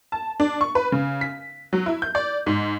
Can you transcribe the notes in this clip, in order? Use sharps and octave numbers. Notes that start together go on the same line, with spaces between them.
A5
D4
C#6
B4
C#3
B6
F#3
E4
G6
D5
G#2